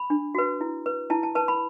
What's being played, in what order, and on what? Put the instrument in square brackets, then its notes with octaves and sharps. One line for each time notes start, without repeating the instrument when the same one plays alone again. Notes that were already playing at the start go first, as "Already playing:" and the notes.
Already playing: [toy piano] B5
D4
F#4 B4
E4
B4
E4 A5
A5
B4 A5
B5